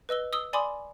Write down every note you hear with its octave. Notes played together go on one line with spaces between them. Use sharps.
B4 D#5 E6 G7
D#6 E6 G7
D5 G#5 B5 C6 D6 D#6